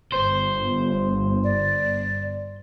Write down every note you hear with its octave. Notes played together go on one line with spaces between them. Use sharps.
G1 C5
D5